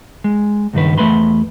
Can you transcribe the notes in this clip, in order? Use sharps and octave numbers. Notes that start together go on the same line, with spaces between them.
G#3
C#2 G2 D#3 B4
E2 A3 B4 B5 C6